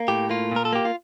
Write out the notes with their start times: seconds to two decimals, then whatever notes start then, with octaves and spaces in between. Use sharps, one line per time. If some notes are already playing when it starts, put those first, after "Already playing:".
Already playing: A#3
0.08 A2 G4
0.30 A#3 F4
0.52 A#2 A#4
0.65 A4
0.73 A#3 G4
0.85 F4